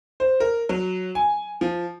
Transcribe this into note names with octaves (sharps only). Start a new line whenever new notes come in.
C5
A#4
F#3
G#5
F3